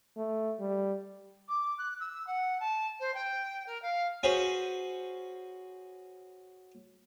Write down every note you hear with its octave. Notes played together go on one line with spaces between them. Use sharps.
A3
G3
D6
F#6
E6
F#5
A5
C5
G5
A#4
F5
C#4 F#4 G#4 B4 C5